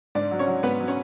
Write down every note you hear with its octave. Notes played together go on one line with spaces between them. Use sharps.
G#2 D4 D5
F#3
C#4 C#5
F#3
G#2 B3 B4
F#3
C#4 C#5